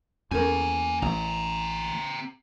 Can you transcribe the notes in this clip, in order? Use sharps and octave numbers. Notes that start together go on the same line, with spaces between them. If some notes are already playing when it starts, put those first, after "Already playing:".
E2 A#3 C#4 A4 A#4 G#5
A1 C4 A#5